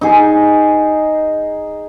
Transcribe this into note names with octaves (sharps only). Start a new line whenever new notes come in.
D#4 G#4